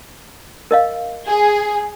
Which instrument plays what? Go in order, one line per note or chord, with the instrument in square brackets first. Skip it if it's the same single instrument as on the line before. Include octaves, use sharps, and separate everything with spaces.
[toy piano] A#4 D#5 F5
[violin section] G#4